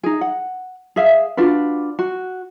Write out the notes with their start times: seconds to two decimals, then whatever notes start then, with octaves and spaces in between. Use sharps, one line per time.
0.03 D#4 G#4
0.21 F#5
0.96 G#4 E5 F5
1.37 D4 F4 F#4 B4
1.99 F#4